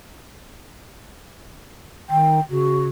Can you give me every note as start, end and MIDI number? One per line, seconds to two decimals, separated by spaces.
2.09 2.40 51
2.09 2.38 79
2.50 2.89 49
2.50 2.87 66